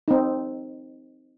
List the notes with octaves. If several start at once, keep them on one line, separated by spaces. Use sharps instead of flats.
C4 D#4